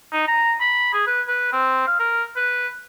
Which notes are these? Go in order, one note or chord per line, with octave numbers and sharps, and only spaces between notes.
D#4
A#5
B5
G#4
B4
B4
C4
F5
A#4
B4